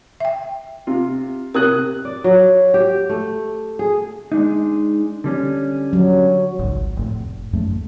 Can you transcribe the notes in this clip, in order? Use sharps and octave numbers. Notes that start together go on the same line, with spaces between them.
E5 G5
C3 F4
C3 A#4 D#6 F#6
D5
F#3
G4
A3
G#4
G#3 D4 D#4
D3 G3 C#4
F#3
G#1 C#2
F1 A2
F#2 A3